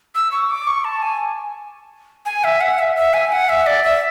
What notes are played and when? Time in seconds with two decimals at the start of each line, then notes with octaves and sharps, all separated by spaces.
0.15 E6
0.32 C#6
0.50 D6
0.67 C#6
0.84 A5
1.02 G#5
2.26 G#5
2.44 E5
2.61 F#5
2.79 E5
2.96 E5
3.14 G#5
3.32 F#5
3.49 E5
3.67 D5
3.84 E5